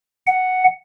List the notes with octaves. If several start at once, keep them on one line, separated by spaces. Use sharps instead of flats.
F#5